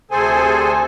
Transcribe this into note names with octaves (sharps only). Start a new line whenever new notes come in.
D2 C3 G#4 A4 C5 G#5